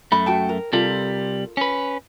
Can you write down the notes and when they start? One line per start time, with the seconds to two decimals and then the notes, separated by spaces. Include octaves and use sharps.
0.12 F#2 A3 B5
0.26 F#4 G5 A5
0.49 A#4
0.73 C3 G3 F4 A4 A#4
1.57 C#4 B4